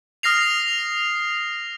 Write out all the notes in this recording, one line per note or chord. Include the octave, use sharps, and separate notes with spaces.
D#6 F6 A#6 C7 F7